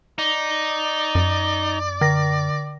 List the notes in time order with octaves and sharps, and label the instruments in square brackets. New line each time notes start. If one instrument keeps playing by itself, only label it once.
[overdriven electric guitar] D#4 [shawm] D5
[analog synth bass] F#2
[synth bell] D3 A#6